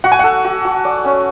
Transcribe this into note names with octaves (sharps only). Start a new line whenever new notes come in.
F#4 F#5
G#5
A4 F#5
F#4
F#4
D5
C#4